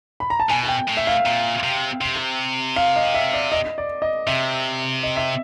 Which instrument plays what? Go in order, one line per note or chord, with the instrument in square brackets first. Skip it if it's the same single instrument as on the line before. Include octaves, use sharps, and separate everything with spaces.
[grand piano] B5
A#5
A5
[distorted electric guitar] B2 [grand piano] G#5
[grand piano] G5
[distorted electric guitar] A2
[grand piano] E5
F5
[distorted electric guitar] A#2
C3
C3
[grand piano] F5
D#5
E5
D5
D#5
D5
D#5
[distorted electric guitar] C3 [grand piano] E5
[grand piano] D#5
E5